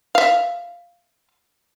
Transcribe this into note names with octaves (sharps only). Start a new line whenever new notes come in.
E5 F5